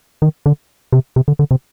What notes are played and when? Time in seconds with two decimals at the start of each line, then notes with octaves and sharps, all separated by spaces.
0.22 D#3
0.46 D3
0.93 C3
1.16 C3
1.28 D3
1.39 D3
1.51 C3